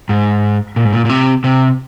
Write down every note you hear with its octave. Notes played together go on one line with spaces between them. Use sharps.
G#2
A#2
G#2
A#2
A#2
C3
C3